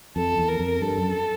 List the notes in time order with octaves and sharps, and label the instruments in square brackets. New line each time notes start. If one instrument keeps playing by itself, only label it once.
[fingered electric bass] F2 [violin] A4
[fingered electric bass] E2
[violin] A#4
[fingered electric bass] F2
[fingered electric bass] G2 [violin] A4
[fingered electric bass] F#2